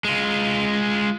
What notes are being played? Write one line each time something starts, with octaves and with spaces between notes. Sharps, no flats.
G#3 F4